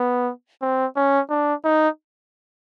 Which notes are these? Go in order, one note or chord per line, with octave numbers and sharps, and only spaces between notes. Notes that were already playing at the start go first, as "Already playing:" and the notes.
Already playing: B3
C4
C#4
D4
D#4